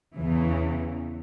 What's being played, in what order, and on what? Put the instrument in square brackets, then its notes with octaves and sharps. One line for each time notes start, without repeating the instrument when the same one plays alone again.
[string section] E2 C#3 E3